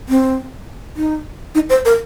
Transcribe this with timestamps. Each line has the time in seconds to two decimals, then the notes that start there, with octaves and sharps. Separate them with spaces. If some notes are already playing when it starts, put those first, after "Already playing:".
0.09 C4
0.97 D#4
1.55 D#4
1.70 C5
1.85 A#4